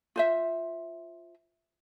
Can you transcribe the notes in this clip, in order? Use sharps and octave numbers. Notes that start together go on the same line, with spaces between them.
F4 C5 E5